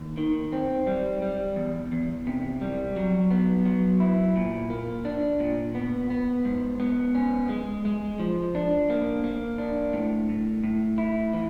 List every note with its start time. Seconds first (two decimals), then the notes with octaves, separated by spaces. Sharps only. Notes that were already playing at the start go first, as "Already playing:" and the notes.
Already playing: D#2
0.18 D#3
0.52 C4
0.87 G3
1.22 G3
1.56 E2
1.92 E2
2.27 C3
2.61 G3
2.96 F#3
3.31 B3
3.65 F#3
4.00 E4
4.36 A#2
4.70 A#3
5.05 D4
5.40 A#2
5.75 B3
6.10 B3
6.45 G#2
6.80 B3
7.15 C#4
7.49 G#3
7.85 G#3
8.19 F3
8.55 D4
8.90 A#3
9.24 A#3
9.58 D4
9.93 A2
10.29 A2
10.64 A2
10.98 E4
11.33 E3